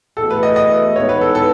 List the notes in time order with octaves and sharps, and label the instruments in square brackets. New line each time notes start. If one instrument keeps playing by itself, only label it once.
[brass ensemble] E2 B2 A3 [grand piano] A4
[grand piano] B4
D#5
D#5
[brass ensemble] G#2 E3 B3 [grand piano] C#5
[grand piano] B4
A4
A4